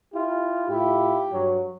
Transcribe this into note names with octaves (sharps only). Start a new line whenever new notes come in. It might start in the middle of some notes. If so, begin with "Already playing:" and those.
E4 F4 G4
A2 E4 F4 G4
G2 F#3